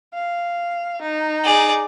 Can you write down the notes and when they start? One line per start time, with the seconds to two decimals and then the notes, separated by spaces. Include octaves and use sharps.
0.14 F5
1.02 D#4
1.44 G#4 D5